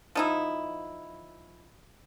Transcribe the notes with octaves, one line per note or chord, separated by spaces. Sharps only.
F3 D#4 E4